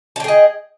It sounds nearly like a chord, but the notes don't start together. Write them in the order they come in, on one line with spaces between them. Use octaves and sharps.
A5 G5 G#4 D#5